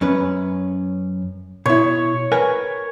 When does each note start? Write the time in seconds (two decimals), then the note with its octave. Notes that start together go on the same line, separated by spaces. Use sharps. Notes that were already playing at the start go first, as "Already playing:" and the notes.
0.01 F#2 C#4 B4
1.66 B2 E4 C#5
2.32 A#4 B4 G#5